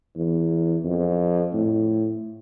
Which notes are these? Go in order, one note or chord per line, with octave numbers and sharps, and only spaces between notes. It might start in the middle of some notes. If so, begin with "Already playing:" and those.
E2
F2
A2